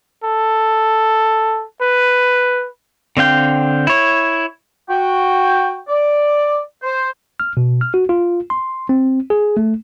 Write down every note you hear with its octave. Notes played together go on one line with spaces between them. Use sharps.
A4
B4
D3 C4 F5 G5
E4 C#5
F#4 G5
D5
C5
F6
B2
F6
F#4
F4
C6
C4
G#4
A3